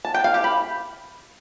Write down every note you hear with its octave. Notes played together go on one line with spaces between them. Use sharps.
A5
G5
F5
G4
B5